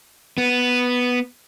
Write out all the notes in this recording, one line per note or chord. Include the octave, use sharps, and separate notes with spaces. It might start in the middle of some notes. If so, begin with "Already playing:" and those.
B3